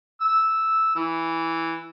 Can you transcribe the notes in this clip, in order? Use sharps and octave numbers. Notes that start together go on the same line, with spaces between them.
E6
E3